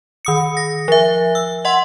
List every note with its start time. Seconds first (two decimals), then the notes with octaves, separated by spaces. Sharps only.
0.25 D#3 D#6 C#7
0.57 A#6
0.88 F3 E5
1.35 E6
1.65 D#5 F#5 C6